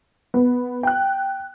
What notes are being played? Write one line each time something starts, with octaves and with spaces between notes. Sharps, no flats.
B3
G5 F#6